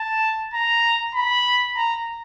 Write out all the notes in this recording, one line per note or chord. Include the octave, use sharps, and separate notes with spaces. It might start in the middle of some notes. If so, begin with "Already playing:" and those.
Already playing: A5
A#5
B5
A#5